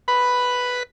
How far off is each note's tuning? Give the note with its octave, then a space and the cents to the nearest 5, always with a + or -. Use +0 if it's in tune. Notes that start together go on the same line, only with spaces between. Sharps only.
B4 +0 B5 +0